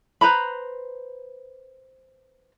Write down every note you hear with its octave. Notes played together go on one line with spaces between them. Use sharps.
B4 C5 A#5 B5